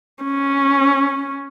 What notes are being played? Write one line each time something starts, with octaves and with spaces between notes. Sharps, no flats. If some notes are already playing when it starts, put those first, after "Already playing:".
C#4